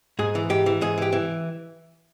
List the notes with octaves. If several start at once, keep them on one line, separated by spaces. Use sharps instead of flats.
G#2 G#4
E3
G#2 G4
E3
G#2 G#4
E3 G4
E3